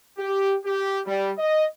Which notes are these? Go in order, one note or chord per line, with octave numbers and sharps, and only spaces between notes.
G4
G4
G3
D#5